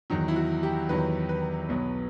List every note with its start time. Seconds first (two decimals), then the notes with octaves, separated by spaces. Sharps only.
0.10 E2 D#3 F#3
0.28 E4
0.36 F#4
0.63 G4
0.89 E2 D#3 F#3 B4
1.29 B4
1.69 B1 B2 F#3